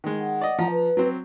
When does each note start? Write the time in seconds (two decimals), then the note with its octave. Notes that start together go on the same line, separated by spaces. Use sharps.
0.04 D#3 G#3
0.19 F#5
0.41 D5 D#5
0.59 F3 A#5
0.71 B4
0.97 F#3 C4